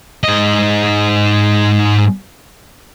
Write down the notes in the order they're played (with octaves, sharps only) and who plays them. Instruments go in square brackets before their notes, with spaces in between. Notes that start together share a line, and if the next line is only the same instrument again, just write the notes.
[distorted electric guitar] G#2 D#5